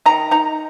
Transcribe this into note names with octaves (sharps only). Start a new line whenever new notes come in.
D#3 A#5
D#4 A#5